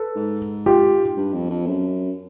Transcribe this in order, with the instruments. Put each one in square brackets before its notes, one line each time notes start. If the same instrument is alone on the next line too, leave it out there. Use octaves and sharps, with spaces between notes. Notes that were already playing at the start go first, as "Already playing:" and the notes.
Already playing: [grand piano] A4 B4
[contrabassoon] G#2
[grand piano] F4 G4
[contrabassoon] G2
F2
F2
F#2